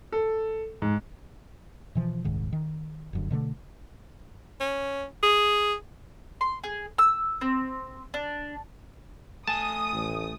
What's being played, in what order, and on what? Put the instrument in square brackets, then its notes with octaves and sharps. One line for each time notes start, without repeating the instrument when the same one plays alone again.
[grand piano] A4
G#2
[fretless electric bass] B2 E3 F3
D#1 C2 G#2 D#3
D#3
F1 F#2 D3
B2 D3 F#3 A3
[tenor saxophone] C#4
G#4
[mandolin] C6
G#4
E6
C4
D4
[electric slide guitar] A3 G#5 [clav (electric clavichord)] A5 [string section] D#6
[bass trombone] A1